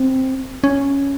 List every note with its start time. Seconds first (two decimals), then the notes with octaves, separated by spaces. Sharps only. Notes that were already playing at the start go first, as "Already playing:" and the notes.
Already playing: C4
0.64 C#4